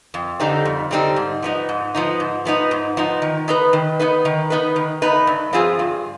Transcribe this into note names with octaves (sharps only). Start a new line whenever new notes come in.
F2
D3 G3 C4 D#4
F2
D3 G3 C4 D#4
G#2
F3 B3 D#4
G#2
F3 B3 D#4
G#2
F3 B3 D#4
G#2
F3 B3 D#4
D#3
B3 D#4 B4
D#3
B3 D#4 B4
D#3
B3 D#4 B4
D#3
B3 D#4 B4
G2
F3 C4 F4 G#4
G2